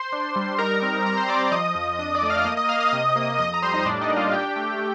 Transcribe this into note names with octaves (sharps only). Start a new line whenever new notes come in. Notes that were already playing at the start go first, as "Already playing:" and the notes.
Already playing: C5 C6
D4
G3
D#4 A#4 A#5
C4
G3 A#4 A#5
C5 C6
C4 D5 D6
F3 D#5 D#6
F2
D4 D#5 D#6
D5 D6
A3
F5 F6
D6
A#3 D#5 D#6
D#5 D#6
A#3 F5 F6
D#5 D#6
C3
A#3
F2 D#5 D#6
A#5
G3 C5 C6
D#4 D#5
A2 D4 D5
D#4 D#5
A#3
F4 F5
D4 G4 G5
A3
A3